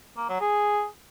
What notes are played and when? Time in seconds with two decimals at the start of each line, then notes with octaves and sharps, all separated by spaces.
0.17 A#3
0.29 F#3
0.41 G#4